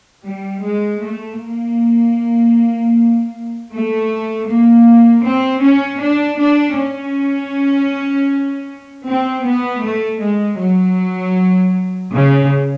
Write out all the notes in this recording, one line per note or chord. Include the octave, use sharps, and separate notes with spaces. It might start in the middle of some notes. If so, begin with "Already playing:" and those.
G3
G#3
A3
A#3
A3
A#3
C4
C#4
D4
D4
C#4
C4
B3
A3
G#3
F#3
C#3